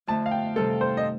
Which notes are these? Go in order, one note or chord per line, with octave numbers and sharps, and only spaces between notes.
F2 D3 A3 A5
F5
G5
C3 D#3 G3 C4 A4
C5
D#5